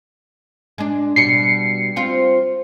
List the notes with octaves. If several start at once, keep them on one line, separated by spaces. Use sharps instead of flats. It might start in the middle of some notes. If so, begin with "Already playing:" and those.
G#3 D4
B2 G3 C7 C#7
C4 F4